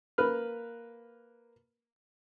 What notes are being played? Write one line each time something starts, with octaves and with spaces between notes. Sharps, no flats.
A#3 B4 F6